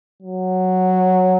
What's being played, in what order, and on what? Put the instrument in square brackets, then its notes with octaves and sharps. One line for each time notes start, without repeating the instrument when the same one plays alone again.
[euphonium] F#3